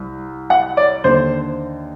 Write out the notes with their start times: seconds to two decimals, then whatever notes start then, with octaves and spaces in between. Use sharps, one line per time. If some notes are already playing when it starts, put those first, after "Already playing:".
Already playing: C2
0.50 F#5
0.77 D5
1.04 D#2 D3 C5